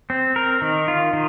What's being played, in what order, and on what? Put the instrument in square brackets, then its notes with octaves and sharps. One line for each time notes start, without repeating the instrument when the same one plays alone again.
[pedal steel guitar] C4
A#4
D#3
F4
D#3